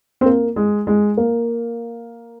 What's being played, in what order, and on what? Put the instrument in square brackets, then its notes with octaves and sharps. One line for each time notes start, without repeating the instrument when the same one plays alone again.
[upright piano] C4
A#3
G#3
G#3
A#3